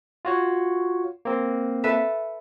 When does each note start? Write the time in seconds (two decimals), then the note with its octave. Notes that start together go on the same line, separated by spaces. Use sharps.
0.25 F4 F#4 C#5
1.25 A#3 C4
1.84 A4 B4 E5